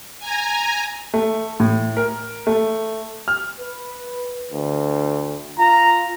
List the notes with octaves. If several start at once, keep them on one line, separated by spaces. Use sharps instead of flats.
G#5 A#5
A3
A2
A#4
A3
F6
B4
D2
F4 A#5